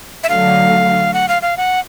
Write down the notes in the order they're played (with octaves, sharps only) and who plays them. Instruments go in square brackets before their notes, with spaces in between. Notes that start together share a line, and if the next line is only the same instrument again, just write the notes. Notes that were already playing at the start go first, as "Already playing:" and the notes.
[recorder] E5
[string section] D3 F#3 A3 [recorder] F5
[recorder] F#5
F5
F5
F#5